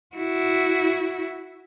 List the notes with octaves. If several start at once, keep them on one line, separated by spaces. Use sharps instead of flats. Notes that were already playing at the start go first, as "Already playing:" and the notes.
E4 F#4